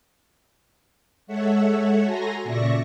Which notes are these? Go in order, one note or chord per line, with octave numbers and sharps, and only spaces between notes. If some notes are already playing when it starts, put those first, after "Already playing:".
G#3 A4 C#5 E5 F#5
F#4 A4 G#5 A#5 C6 A#6
A#2 C#3 D5 E5 C#6 A#6